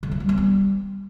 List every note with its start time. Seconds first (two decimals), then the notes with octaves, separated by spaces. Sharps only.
0.03 D3
0.12 F3
0.20 G3
0.29 B3
0.38 G3